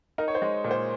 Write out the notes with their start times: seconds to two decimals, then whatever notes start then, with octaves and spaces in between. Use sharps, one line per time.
0.18 D#4 A#4
0.28 C#5
0.35 C5
0.42 G#3
0.64 A#2
0.71 C5